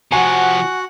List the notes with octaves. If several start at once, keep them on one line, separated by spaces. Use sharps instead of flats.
C3 F3 F#4 F#5 G#5